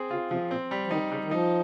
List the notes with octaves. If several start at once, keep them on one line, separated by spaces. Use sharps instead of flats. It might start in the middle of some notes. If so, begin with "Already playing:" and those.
Already playing: C4 G#4
C#3 F4
C3 F3
A#2 C4
G3
F3
D#3 D#4
C#3 G3
D#3
F3 D#4